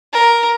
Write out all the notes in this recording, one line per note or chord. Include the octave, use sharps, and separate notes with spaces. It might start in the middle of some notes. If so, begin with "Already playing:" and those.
A#4